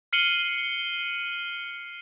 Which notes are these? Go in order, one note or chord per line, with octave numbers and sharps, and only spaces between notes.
F6 C7 C#7 D#7 F#7 G7